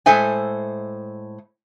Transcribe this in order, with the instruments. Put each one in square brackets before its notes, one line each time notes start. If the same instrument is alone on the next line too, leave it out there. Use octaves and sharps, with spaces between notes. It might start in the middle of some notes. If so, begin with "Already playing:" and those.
[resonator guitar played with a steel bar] A2 G#3 A4 C5 E5 G#5